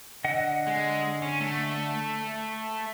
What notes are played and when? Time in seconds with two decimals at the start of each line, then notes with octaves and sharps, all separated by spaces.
0.24 D3 D#5 F#5
0.67 G#3
1.22 C#4
1.41 A3